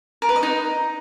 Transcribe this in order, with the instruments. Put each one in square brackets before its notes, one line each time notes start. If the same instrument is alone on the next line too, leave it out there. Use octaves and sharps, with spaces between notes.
[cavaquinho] A#4
B4
D#5
D#4